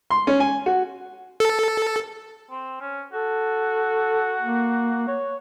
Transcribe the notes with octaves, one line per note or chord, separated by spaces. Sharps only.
C6
C#4
G#5
F#4
A4
C4
C#4
F#4 A4
A#3
C#5